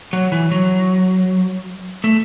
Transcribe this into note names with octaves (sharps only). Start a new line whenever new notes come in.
F#3
E3
F#3
A3